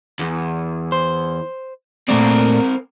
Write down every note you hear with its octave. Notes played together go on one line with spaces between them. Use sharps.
E2
C5
A#2 A3 C4 A#4 D5